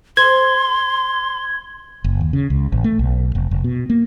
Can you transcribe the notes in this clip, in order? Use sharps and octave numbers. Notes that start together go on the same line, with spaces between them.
C5 C6 G#6
F#1
D#2
C#3
C#2
A1
A3
B1
F1
F1
B2
A#3